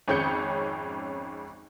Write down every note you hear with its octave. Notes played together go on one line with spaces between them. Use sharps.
G#1 F2 C#4 G#4 G6 C#7